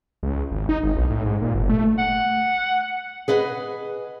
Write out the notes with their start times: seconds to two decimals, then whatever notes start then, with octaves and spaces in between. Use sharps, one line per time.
0.23 C#2
0.51 G#1
0.69 D#4
0.83 G#1
0.96 B1
1.10 A2
1.25 G#2
1.42 A#2
1.55 G1
1.70 A3
1.98 F#5
3.28 G#4 B4 D#5 F#5